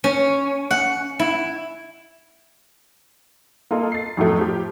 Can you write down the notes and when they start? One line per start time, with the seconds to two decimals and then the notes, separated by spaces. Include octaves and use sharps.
0.04 C#4
0.71 F#5
1.19 E4
3.71 A#3 F4 A4 D#5
3.92 A6 C7
4.17 F2 A2 F#3 A3
4.39 F3 G4